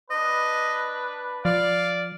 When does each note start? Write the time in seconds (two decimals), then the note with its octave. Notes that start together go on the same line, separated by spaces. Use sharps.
0.11 D4 B4 D#5
1.45 F3 D5 F5